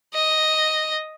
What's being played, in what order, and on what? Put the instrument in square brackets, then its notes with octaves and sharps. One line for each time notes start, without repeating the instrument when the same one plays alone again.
[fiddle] D#5